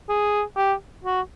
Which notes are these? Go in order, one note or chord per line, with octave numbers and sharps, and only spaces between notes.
G#4
G4
F#4